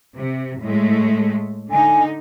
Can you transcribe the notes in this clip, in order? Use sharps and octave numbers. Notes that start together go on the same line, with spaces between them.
C3
A2 G#3 A3
D3 D#4 G#5